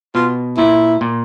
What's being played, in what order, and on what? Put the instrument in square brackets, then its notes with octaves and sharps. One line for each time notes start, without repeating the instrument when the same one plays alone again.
[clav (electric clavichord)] B2 [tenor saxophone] F4
[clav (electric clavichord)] A#2 [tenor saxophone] E4
[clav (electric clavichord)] A#2